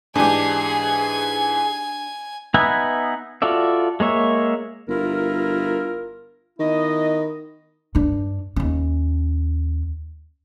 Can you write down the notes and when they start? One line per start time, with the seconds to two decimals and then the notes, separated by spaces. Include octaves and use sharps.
0.16 G#2 E3 D4 G4 G#4 G#5
2.54 B3 D#4 B4 E5 G#5
3.42 F4 F#4 A4 D5 E5
4.00 G#3 A#3 C#5 E5
4.88 G1 E4 F4 A#4
6.59 D#3 B3 E4 D#5
7.95 G2 D4
8.56 D#2 C#4